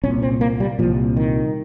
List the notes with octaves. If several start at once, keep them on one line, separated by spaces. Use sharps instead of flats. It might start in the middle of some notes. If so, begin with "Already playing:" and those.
C2 A#2 C#4
C4
A#3
G3
C2 A#2 F3
D#3